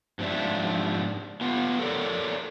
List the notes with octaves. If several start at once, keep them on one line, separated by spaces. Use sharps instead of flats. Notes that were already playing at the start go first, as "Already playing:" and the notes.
G#2 F3 C4 D4 E5
B3 F4
A4 A#4 C#5 D5